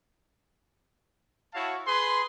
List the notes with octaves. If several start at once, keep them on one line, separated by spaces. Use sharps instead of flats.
E4 F#4 C#5 F5 A5
G#4 B4 C6